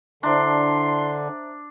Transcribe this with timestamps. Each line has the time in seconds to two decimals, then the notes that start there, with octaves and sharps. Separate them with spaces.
0.23 D3 D4 E4 C5 E5 A#5 C6